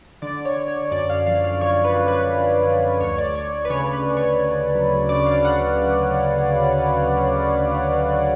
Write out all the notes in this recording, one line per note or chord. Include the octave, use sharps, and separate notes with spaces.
D3 D5
C#5
D3
C#5
F#2 D5
F5
F3 F5
F5
D3 C#5
B4
F3
B4
F#2
D3
D2 C#5
D5
D2 C#5
B4
C#3 C#5
B4
C#3
C#5
C#3
F#3
C#3 D5
F5
F#5